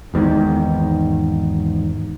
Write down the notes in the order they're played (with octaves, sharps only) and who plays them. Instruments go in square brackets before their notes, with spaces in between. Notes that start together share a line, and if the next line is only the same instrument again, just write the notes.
[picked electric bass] G#1 E2 G#2 D#3